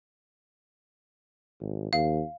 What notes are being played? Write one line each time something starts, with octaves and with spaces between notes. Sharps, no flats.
G#1
D#2 F5